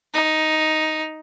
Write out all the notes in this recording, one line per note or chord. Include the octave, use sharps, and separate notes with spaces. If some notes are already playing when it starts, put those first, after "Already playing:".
D#4